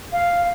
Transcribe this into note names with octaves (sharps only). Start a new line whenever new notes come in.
F5